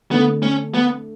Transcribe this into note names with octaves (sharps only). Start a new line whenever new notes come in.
D3 A3 B3 D4 A4
C#4
B3